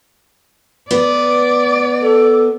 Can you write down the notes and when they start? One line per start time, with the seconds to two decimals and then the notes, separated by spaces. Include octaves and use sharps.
0.91 B3 D5
2.01 A4